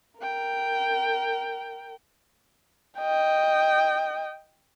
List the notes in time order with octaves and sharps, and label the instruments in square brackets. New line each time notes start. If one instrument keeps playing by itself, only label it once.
[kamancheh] A#4 G5
D#5 G5